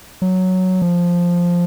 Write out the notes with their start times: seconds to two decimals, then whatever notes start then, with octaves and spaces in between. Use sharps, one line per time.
0.22 F#3
0.82 F3